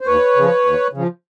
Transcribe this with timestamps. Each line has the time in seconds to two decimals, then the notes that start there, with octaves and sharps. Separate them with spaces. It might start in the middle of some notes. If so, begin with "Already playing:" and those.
0.01 C5
0.07 D#2 B4 C#5
0.36 C#3 F3
0.65 D#2
0.93 C#3 F3